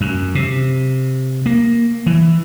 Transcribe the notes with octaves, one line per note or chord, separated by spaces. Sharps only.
F#2
C3
A#3
E3